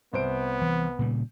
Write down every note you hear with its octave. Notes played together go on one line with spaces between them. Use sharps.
C2 B3 C5 D7
E3
A#2 C#3 G3